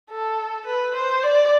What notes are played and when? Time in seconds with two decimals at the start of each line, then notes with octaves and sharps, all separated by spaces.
0.11 A4
0.67 B4
0.95 C5
1.23 D5